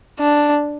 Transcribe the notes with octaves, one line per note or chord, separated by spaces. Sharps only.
D4